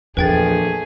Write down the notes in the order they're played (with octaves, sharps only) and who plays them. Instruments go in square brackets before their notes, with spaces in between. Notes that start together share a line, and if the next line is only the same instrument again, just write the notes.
[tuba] A#1 [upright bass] E2 [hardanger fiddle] A3 G#4 [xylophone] B4 G5 A6